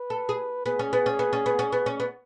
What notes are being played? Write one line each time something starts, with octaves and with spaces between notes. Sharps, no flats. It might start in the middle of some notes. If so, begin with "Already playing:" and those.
Already playing: B4
A4
G#4
B3 G#4
C#4
B3
C#4
B3
C#4
B3
C#4
B3
C#4
B3